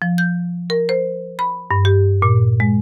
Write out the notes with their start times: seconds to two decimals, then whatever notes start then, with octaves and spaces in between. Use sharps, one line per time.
0.02 F3
0.18 G6
0.70 A#4
0.89 C5
1.39 B5
1.71 G2
1.85 G4
2.22 A#2
2.60 G#3